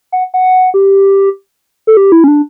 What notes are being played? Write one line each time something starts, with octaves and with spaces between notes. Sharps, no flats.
F#5
F#5
G4
A4
G4
E4
C#4
D4